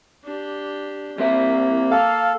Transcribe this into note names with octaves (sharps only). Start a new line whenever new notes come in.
D4 G4
G3 A#3 C4 E5
A4 F5